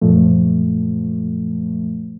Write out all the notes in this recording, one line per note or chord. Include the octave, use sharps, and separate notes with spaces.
F#2 A#2 F3 A3